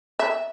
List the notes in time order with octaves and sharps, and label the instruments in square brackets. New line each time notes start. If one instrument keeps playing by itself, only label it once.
[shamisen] E5